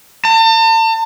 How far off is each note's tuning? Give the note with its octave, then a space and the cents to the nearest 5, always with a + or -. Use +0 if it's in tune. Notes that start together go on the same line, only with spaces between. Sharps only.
A5 +40